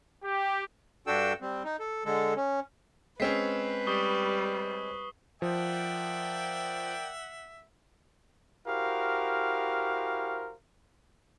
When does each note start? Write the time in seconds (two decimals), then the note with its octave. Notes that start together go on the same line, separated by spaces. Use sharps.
0.24 G4
1.07 G2 D4 F#4 A4 G5 E6
1.41 G3 C4
1.64 D#4
1.79 A4
2.05 D3 G#3 A4
2.37 C#4
3.20 G#3 C4 C#4 B4 B6 C7
3.87 G3 C#6 D#6 G7
5.42 F3 A#4 D5 E5 F#5 G5
8.67 E4 F#4 G4 A#4 C5 F5